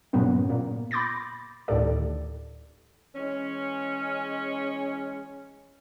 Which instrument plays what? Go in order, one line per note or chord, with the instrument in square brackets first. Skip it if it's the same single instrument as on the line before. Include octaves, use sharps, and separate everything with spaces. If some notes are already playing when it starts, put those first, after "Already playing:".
[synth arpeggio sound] G2 A#2 C#3 F#3 B3 C#4
A#2
B5 C6 D6 G6 A6 A#6
D2 A2 D#3 G4 A4 D5
[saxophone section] E3 G#3 C#4